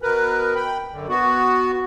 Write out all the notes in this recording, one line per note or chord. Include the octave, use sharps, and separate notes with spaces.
B2 A#4 B4
G5 B5
F#2 D3
B3 F#4